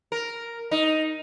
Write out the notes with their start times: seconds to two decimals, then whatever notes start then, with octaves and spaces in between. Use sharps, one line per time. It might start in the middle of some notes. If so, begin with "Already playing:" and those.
0.12 A#4
0.71 D#4